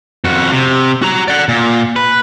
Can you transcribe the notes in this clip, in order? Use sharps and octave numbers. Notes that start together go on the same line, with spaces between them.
F2 F#4
C3
F#4 A#5
D5 F#5
A#2
B4